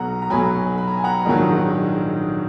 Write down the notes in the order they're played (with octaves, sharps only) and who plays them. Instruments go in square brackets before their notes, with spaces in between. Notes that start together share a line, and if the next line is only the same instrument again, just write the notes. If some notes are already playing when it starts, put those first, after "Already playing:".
Already playing: [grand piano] B1 B2 F#3 F#5 A#5
A#5
B1 B2 F#3 G#5 B5
B5
A#5
G#5
F#5 A#5
A#1 G#2 D#3 F#3